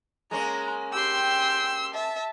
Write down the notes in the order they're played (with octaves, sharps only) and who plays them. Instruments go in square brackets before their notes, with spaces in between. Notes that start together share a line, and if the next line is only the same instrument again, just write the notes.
[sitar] G#3 A#3 C#4 [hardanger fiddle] A#5
[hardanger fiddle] G4 C6 [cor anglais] G5 [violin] E6
[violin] E5 A5